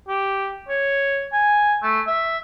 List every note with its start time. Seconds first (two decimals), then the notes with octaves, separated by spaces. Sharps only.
0.08 G4
0.69 C#5
1.33 G#5
1.82 A3
2.07 E5